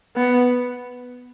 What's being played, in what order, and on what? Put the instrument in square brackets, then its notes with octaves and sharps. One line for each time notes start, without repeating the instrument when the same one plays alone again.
[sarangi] B3